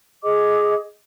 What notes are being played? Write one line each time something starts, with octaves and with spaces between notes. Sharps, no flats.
G#4 D#5 D6